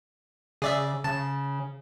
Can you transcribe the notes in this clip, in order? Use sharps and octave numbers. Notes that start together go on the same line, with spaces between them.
C#3 G#4 D5 E5
C#3 A5